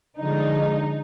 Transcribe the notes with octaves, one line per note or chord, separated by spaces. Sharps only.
D3 F3 G#3 D#4